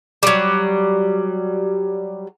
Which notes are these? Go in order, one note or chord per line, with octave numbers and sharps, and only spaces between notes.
F#3 G3